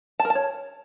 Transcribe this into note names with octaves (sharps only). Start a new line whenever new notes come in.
A5
A#4
A5
C#5